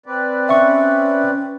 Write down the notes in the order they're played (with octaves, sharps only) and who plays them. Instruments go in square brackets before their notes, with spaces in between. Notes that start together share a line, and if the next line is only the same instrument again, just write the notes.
[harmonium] C4 B4 D5
[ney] C#4 [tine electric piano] E5 C#6